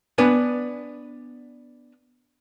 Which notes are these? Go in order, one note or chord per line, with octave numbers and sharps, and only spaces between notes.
B3 D4 B4 G#5